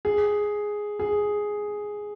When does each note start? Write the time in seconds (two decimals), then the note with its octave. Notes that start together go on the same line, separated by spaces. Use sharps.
0.05 G#4
1.00 G#4